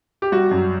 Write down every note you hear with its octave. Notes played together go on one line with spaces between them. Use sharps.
G4
G3 F#4
F#2